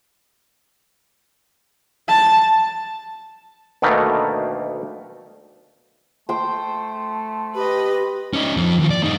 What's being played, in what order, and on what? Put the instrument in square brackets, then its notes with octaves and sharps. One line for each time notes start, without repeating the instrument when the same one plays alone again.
[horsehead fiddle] A5
[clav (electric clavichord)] D2 B2 D#3 A3 A#3
[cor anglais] A3 [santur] C5 G5
[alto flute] G4 [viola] B4 D#5
[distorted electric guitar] C#4 D#4
F2 F3
D#2 F3
D5
G2 D#4